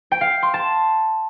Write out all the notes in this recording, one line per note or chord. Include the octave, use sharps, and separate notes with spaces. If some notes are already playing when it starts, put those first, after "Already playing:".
G5
F5
C6
A5